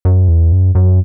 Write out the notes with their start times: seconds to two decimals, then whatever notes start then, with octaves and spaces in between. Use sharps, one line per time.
0.05 F#2
0.28 E2
0.52 F#2
0.75 F#2